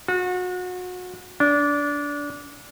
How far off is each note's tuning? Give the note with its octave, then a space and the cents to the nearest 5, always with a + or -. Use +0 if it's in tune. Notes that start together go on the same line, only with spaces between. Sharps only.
F#4 -30
D4 -20